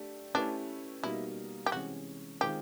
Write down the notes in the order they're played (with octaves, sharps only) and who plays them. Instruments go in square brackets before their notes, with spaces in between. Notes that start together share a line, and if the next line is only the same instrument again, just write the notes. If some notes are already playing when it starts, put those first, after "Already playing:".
Already playing: [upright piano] A3 D4 G4
[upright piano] A3 C#4 E4 G4 B4 [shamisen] D4
[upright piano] B2 G3 A#3 D#4 [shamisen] E4
[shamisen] G4
[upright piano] C3 E3 G#3 C#4 [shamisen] F#4
[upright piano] D#3 G#3 C4 F4 [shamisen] G4